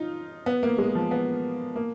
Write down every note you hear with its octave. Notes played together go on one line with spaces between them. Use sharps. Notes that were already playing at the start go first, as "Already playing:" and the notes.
Already playing: D#4 F4
B3
A#3
G#3
F3
B3
A#3